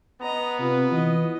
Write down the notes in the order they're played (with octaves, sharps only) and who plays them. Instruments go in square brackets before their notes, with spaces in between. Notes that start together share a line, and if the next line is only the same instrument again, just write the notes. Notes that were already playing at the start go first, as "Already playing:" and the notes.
[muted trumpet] B3 [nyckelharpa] D#5 A#5
[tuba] C3 [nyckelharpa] F4 B4
[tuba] E3 [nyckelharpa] D#5